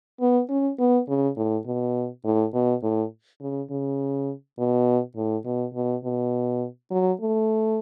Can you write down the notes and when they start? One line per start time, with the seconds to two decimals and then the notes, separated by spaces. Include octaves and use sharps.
0.21 B3
0.50 C#4
0.79 B3
1.08 C#3
1.37 A2
1.66 B2
2.25 A2
2.54 B2
2.83 A2
3.41 C#3
3.70 C#3
4.58 B2
5.16 A2
5.45 B2
5.75 B2
6.04 B2
6.91 F#3
7.21 A3